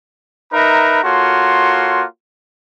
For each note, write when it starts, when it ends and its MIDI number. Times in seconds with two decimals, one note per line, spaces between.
0.52 1.01 63
0.52 1.01 70
0.52 1.01 71
0.52 1.01 76
0.52 1.01 82
0.52 1.01 83
1.03 2.04 58
1.03 2.04 65
1.03 2.04 66
1.03 2.04 69
1.03 2.04 73
1.03 2.04 84